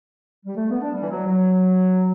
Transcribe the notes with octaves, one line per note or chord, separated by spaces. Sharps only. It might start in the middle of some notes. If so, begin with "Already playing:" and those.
G3
A3
B3
D4
G3
E3
F#3
F#3